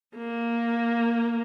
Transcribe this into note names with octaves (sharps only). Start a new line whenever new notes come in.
A#3